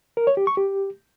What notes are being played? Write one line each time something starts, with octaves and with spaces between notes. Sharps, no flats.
A#4
C#5
G4
C#6
G4